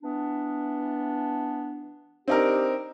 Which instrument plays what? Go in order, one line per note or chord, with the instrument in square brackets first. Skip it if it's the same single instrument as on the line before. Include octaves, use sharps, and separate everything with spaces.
[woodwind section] E3 B3 D4
[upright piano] C4 D#4 A#4 [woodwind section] D4 G4